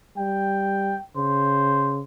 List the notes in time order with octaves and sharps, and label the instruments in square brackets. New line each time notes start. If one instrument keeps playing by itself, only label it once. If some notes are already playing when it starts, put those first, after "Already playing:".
[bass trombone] G3 [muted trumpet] G5
[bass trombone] C#3 [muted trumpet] C5